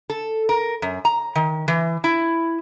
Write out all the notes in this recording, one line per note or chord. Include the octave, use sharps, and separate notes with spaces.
A4
A#4
F#2
A#5
D#3
E3
E4